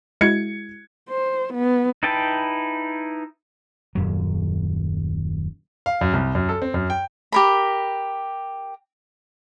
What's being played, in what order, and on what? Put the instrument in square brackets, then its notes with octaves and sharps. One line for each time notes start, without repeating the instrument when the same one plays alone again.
[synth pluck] G#3 E4 F#4 [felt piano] G#6 C#7
[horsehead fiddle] C5
B3
[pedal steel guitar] D#4 E4 B4 G5 A5
[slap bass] D#1 F#2 F#3
[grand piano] F5
F#2
C2
F#2
A4
C4
F#2
G5
[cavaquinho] G4 A#4 B5